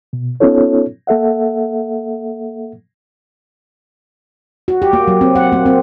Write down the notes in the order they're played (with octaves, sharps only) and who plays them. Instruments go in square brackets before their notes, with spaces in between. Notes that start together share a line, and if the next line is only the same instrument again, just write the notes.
[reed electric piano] B2
B3 C#4 D#4 F4 A4 C#5
A#3 A4 E5 F#5
[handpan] F#4
G4
A#3
F#3
C4
F#5
A#3
C4